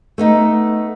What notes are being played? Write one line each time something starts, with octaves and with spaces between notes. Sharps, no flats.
A3 B3 D#4